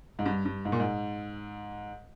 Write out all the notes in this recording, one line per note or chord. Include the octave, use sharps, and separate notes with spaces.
G#2
G2
G2
G#2
A#2
G#2